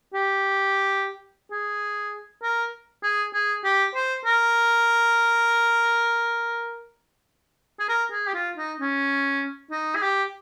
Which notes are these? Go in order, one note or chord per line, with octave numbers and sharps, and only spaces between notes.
G4
G#4
A#4
G#4
G#4
G4
C5
A#4
G#4
A#4
G#4
G4
F4
D#4
C#4
D#4
G#4
G4